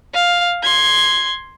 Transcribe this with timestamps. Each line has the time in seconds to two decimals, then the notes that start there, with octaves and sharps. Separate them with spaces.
0.14 F5
0.63 C6 G#6